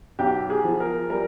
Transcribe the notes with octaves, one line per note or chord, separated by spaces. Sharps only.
B1 G4
G#4
F3
A#4
G3 A#4